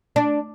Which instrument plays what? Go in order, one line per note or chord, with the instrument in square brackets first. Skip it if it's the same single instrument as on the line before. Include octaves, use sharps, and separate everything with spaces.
[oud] D4